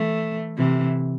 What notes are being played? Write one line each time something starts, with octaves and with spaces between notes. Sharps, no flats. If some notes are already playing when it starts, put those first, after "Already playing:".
Already playing: E3 A3
C3 E3